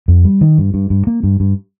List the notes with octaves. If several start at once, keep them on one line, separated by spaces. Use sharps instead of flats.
F2
G3
D#3
G2
G2
G2
A#3
G2
G2